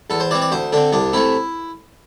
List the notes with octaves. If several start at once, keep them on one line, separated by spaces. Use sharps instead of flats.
E2 A4
C5
E3 C4 D5
D5
D2 C5
D3 C4 D4
C2 D4
C3 A3 E4